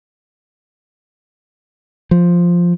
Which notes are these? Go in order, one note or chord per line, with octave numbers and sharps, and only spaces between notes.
F3